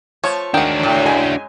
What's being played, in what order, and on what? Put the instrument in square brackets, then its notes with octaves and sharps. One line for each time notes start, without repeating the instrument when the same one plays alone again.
[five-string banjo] F3 A3 [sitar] C#5
[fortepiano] G#2 D#3 [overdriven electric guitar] D4 F#4 [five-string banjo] F#5 G5
[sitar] D#2 A2
[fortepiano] F#2 G#3 G#5